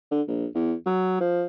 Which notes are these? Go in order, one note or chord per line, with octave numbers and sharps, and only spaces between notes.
D3
A#1
E2
F#3
F3